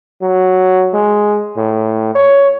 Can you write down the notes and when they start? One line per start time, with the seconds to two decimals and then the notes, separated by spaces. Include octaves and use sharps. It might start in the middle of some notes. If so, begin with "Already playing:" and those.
0.22 F#3
0.94 G#3
1.57 A2
2.15 C#5